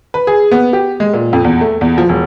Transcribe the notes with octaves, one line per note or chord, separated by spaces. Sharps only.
B4
G#4
B3
G4
G#3
A#2
F2
E2
A3
E2
F3
E1